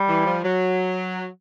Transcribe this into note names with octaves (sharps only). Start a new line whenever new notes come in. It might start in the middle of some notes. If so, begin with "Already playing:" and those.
Already playing: G3
E3
F3
F#3